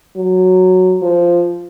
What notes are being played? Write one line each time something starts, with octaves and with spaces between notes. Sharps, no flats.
F#3
F3